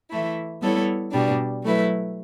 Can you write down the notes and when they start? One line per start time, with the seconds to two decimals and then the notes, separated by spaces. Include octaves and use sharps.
0.10 E3 A3 E4
0.62 G3 B3 E4 A4 C#5
1.12 B2 G3 D4
1.63 F#3 A3 E4 B4